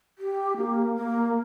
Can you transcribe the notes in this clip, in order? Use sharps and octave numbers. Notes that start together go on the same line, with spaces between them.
G4
A#3
A#3